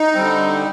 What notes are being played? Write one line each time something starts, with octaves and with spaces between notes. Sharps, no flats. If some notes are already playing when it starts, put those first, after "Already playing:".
Already playing: D#4
D3 G3 C4